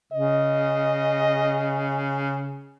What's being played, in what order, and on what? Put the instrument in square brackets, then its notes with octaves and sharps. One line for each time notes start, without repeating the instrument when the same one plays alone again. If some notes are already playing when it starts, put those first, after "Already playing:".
[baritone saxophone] C#3 [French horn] D#5